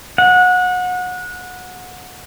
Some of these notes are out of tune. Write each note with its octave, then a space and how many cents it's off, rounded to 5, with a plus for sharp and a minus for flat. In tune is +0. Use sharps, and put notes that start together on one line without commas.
F#5 -25